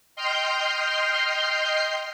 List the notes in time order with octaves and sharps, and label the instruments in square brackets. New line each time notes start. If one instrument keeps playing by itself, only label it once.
[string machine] D#5 G5 C6 F6 G6 C7